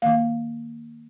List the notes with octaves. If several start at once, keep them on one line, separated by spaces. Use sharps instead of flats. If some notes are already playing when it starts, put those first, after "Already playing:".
D#3 A#3 F5